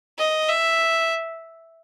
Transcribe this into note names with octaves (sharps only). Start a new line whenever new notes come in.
D#5
E5